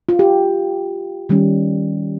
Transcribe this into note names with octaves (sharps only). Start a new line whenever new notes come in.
F4
G4
D#3 G3 C#4